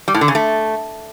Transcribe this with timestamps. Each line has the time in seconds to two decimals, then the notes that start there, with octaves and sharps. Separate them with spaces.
0.08 G3
0.14 A2
0.21 D3
0.28 C#3
0.35 A3